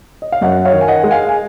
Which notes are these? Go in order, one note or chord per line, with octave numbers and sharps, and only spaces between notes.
D#5
F5
F#2 D#5 F#5
C#5 F5
D#3
G#5
D#5 F#5
G#3
F5 G#5
G#5